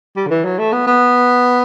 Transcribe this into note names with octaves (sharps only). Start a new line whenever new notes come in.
G3
D3
E3
F#3
A3
B3
B3